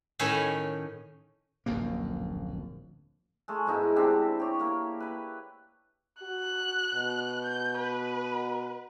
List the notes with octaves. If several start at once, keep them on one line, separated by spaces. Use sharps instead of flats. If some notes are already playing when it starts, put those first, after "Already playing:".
A2 D#3 C#4 E5 G#5
D1 A#1 F#2 A#3
G#3 A3
G#2 B2 D#4 E4
C3 C4 D4 G4
G4 C#5
A#3 G4
B4 B5
F#4 F#6
B2
G6
B4